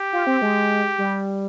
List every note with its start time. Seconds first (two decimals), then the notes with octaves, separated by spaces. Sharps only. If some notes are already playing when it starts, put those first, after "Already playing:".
Already playing: G4
0.13 F4
0.27 C4
0.42 G#3
0.98 G3